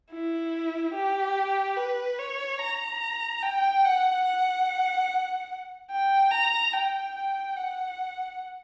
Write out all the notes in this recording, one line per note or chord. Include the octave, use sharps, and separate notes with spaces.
E4
G4
B4
C#5
A#5
G5
F#5
F#5
G5
A#5
G5
G5
F#5